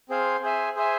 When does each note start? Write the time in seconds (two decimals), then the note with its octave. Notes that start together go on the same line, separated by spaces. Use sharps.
0.09 C4 G#4 C5 F5
0.43 G#4 C5 E5 G#5
0.76 G#4 C5 E5 G#5